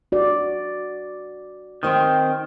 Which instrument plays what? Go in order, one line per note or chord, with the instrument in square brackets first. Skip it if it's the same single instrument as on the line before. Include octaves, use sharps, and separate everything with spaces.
[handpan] F#4 D5
[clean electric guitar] D#3 [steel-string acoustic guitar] C4 C5 G5